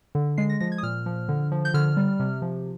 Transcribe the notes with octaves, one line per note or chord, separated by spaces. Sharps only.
D3
G#3 C7
A#6
F3 A#6
G#6
D#6
A#2 F6
F3
D3
F3
G6
D3 F6
G3
C3
F3